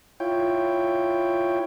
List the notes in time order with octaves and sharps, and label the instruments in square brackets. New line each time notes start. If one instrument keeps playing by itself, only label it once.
[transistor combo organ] E4 F4 C#5 G5